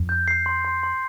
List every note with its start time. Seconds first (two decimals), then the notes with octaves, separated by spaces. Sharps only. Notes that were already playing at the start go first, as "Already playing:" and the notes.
Already playing: F2
0.09 G6
0.28 C7
0.46 C6
0.65 C6
0.83 C6